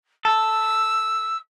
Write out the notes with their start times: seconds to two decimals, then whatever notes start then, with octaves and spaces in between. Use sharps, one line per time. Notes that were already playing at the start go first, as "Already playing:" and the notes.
0.25 A4 E6